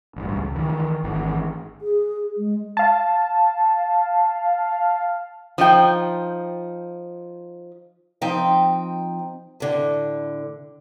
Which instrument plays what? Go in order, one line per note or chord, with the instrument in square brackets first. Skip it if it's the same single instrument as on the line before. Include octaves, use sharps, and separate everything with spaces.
[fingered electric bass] A1 G2
C#2
D#3 E3
G#1 D#3 E3
[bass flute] G#4
G#3
[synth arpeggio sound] F5 A5
[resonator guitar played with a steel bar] F3 D#4 F#4 G5
[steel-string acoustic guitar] F3 C4 D#4 G5
A2 D3